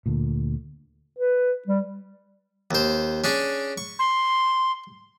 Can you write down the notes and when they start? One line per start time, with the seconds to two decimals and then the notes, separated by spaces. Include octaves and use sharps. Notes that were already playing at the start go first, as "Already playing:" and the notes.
0.06 D2 A#2
1.19 B4
1.68 G3
2.71 D#2 C5
3.24 C#4 D4 G#4
3.78 C#6
3.99 C6